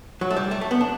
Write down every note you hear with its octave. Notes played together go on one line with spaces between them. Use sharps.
F#3
A3
G3
A3
A3
B3
D4